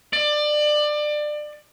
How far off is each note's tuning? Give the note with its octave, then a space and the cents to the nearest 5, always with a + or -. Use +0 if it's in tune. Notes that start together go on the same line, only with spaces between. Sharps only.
D5 +25